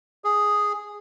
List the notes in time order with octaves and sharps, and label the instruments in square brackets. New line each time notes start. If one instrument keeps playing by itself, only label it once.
[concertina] G#4